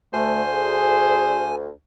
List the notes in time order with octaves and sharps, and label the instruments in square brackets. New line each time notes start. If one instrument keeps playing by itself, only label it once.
[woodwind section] D2 [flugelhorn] A3 [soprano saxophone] C5 [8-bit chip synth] G#5
[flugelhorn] G#4